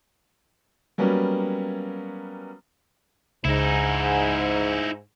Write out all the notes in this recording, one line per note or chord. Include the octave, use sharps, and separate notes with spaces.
F#3 G3 A#3 B3 C#4
C#2 G#2 D#4 E4